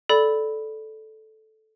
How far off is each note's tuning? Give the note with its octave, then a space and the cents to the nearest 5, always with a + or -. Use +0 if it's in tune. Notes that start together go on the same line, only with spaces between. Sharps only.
A4 -10 D5 +0 B5 +0